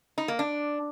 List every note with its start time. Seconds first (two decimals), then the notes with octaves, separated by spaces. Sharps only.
0.18 D#4
0.28 A#3
0.39 D4